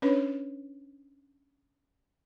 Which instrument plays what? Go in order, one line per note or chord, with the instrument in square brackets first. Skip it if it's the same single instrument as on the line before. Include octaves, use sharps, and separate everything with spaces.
[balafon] C#4 D4 B4 C#5